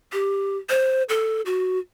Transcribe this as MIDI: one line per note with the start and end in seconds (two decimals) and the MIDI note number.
0.13 0.57 67
0.69 1.03 72
1.09 1.42 69
1.46 1.79 66